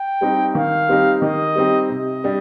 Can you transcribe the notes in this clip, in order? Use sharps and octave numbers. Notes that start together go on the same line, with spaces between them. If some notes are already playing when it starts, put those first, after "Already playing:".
Already playing: G5
G3 C4 D#4 G4
D#3 F5
G3 C4 D#4 G4
D#3 D#5
G3 C4 D#4 G4
C3 D#5
G3 D4 G4